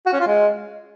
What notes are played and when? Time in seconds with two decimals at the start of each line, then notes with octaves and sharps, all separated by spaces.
0.06 F#4
0.13 C#4
0.20 F4
0.27 G#3